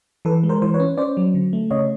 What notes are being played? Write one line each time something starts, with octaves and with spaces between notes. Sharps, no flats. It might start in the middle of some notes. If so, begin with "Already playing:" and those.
E3 A4 B4
G#3
A#4 C5
E3 C5
B4 C#5
C#4
C#4 C5 D5
F#3
D3
A3
C#3 C#5 D#5